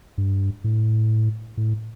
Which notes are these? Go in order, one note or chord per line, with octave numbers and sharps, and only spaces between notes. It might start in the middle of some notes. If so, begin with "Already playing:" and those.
G2
A2
A2